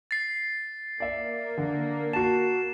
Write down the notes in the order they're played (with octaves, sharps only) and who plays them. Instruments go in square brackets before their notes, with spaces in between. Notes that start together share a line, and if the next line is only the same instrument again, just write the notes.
[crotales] A6 C7
[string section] A#3 [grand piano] D5 E5
[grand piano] D3
[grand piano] F#4 A5 [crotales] C7 E7